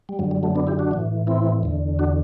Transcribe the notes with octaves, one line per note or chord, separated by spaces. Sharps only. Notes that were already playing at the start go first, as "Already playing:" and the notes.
G3
F#2 D3 F#3
G3
F#3 A3
B3 D4
E4 G4
D4 F#4
A2 E3
C4 E4
E2 D3
D4 F#4